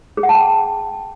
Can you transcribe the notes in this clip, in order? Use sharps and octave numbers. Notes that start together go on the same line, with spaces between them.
G#4
F#5
A5
G5